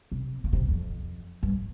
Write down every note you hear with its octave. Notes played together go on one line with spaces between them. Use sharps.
C3
C#3
C3
F2
G2